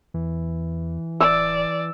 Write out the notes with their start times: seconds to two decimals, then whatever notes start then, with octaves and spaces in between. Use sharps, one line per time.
0.14 E2 E3
1.21 D1 D5 E6